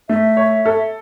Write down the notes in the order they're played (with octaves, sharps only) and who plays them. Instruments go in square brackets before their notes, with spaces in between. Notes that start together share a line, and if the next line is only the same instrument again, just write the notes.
[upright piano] A3 [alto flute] E5
[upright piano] C#5
A4